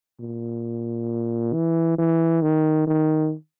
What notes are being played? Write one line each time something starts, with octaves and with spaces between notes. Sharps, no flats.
A#2
E3
E3
D#3
D#3